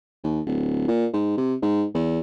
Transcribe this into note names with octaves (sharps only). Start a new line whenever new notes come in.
D#2
D1
A#2
G#2
C3
G#2
E2